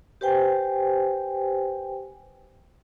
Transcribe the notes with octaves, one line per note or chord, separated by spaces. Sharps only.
G4 B4 C5 G5 G#5